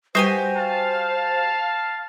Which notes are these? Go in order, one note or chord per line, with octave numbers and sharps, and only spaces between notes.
G3 F#4 G4 B4 C5 G#5
F5 A5